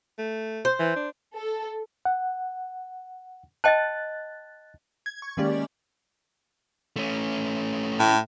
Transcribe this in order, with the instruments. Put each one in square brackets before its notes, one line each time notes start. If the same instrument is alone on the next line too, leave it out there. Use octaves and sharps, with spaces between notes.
[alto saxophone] A3
[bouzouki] C5
[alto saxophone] E3
D4
[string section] A4
[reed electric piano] F#5
[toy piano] D#5 G5 A5 [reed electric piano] F#6 A6
[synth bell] G#6
C#6
D#3 G#3 A#3 C#4 G4 D5
[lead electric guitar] A3 C#4
[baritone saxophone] A2